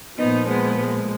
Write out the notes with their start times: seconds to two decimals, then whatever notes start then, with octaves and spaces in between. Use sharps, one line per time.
0.18 A#2 F3 B3 D#4
0.48 G#3 B3
0.78 G#3